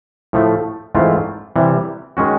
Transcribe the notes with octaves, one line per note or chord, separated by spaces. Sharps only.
A2 F3 A3
G#2 E3 A3 C4 F4
C3 E3 G3
D#3 G#3 C#4 F#4